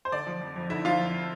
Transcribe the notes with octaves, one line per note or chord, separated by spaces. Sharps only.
C5
D3 D5
F3
F2
F2
D3 E4 E5
F3 F4 F5
F2